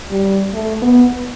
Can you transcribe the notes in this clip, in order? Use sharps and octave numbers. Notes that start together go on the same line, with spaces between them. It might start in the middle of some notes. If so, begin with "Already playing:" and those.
G3
A3
B3